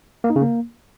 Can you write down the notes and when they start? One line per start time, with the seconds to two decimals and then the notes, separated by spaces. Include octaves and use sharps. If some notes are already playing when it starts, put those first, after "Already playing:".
0.24 A#3
0.30 D#4
0.36 C#3
0.42 A#3